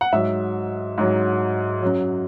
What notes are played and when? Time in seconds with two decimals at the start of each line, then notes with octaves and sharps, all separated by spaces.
0.01 F#5
0.12 G#2 F#3 E5
0.98 G#2 F#3
1.82 F#2 F#3